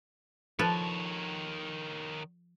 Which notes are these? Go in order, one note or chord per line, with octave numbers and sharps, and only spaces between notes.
D#3 F3 A4 B4 C#5